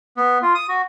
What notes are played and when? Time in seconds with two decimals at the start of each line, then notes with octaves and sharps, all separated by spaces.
0.17 B3
0.42 F4
0.55 D#6
0.69 F#4